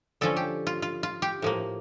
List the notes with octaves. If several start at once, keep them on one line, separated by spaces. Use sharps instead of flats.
D3 F3 C#4 A4
G4
F4
F4
F4
G4
A2 F3 A#3